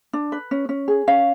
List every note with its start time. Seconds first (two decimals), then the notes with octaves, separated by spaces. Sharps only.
0.13 D4
0.32 B4
0.51 C#4
0.69 C#4
0.88 G#4
1.07 C#4 F5